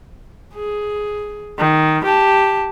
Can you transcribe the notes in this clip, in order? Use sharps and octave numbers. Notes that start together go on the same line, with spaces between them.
G#4
D#3
G4 A5